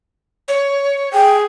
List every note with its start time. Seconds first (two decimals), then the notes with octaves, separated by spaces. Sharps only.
0.48 C#5
1.13 G#4 G5